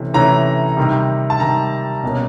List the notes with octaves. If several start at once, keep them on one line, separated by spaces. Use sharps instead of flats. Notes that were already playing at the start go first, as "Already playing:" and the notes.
Already playing: C3 E3 A3 C#4
C3 E3 A3 C#4 A#5
C3 D#3 G3
A5
C3 D#3 G3 A#5
B2 G3 A#3 C#4